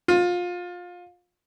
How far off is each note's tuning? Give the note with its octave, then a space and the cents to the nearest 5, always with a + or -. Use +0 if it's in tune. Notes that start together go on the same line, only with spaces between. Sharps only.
F4 +25